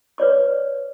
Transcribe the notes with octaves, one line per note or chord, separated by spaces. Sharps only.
B4 C#5 D5 D6